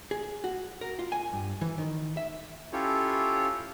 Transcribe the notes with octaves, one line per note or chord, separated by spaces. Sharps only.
G#4
F#4
A#4
F4
G#5
G2
E3
D#3
E5
C#4 E4 F4 G4 A4 C#5